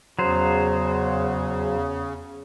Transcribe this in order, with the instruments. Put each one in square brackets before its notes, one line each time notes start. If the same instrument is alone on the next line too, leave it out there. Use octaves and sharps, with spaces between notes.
[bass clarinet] E2 [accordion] C#3 [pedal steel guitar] F#3 C5